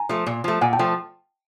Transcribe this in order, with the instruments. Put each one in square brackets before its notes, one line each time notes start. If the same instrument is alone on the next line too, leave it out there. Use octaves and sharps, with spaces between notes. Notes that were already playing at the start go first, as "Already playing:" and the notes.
Already playing: [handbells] G#5 A#5
[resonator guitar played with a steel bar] F3 A3
A#2
F3 A3
[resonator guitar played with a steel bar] A#2 [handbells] F#5 G#5
[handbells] G5 A5
[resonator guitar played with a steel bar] F3 A3